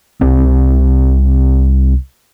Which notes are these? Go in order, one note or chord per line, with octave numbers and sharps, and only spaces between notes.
C2 C4